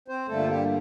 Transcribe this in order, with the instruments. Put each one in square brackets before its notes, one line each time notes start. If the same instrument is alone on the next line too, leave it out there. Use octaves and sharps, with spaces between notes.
[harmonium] C4 C5
G2 D3 G3 A3 A#3 A4
F4
G3 G4